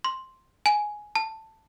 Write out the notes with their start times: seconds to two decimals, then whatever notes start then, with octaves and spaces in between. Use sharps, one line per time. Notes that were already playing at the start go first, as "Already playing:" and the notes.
0.04 C6
0.66 G#5
1.15 A5